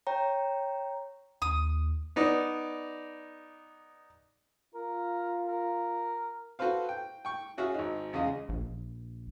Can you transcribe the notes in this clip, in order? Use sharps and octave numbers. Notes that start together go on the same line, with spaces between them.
C#5 G5 A#5
D#2 D#6
B3 D#4 D5
F4 A#4
A#4
F#4 A4 B4 C5 F5
G5
G5 C#6
C#4 F4 F#4 G#4 E5 F5
G#1 D#4
E2 C#3 G#3 F4 D#5
A#1